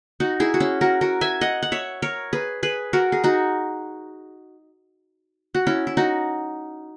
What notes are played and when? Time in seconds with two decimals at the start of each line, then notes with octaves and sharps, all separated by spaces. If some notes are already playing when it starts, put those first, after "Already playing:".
0.20 D#4 F#4
0.40 E4 G#4
0.54 F#4
0.60 C#4 E4
0.81 F#4 A#4
1.01 F#4 A#4
1.21 E5 G#5
1.41 D#5 F#5
1.63 F#5
1.72 C#5 E5
2.02 A#4 C#5
2.33 G#4 B4
2.63 G#4 B4
2.93 F#4 A#4
3.12 G#4
3.24 D#4 F#4
5.55 F#4
5.67 C#4 E4
5.87 E4
5.97 D#4 F#4